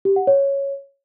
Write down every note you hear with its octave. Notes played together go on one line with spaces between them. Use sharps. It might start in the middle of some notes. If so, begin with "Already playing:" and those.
G4
F#5
C#5